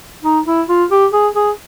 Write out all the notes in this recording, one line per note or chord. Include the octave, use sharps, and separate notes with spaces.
D#4
E4
F4
G4
G#4
G#4